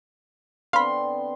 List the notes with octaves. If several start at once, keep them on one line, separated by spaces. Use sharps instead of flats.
D3 B3 C4 F5 B5 C6